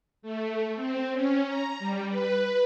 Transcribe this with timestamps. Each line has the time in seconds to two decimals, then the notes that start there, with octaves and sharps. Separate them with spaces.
0.22 A3
0.75 C4
1.13 C#4
1.48 A#5
1.79 G3
2.10 B4